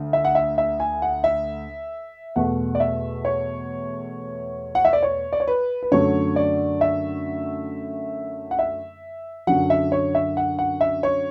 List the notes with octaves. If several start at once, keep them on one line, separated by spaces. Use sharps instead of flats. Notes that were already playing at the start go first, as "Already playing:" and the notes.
Already playing: D2 D3
E5
F#5
E5
E5
G#5
F#5
E5
E2 B2 A3 F#5
D5
E5
C#5
F#5
E5
D5
C#5
D5
C#5
B4
B4
F#2 D3 F#3 A3 C#5
D5
E5
F#5
E5
F#2 D3 F#3 F#5
E5
C#5
E5
F#5
F#5
E5
C#5